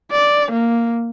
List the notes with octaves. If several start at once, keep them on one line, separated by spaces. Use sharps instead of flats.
D5
A#3